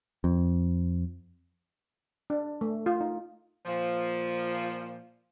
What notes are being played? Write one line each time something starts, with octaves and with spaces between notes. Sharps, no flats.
F2
D4
A3
F4
D#4
A#2 F3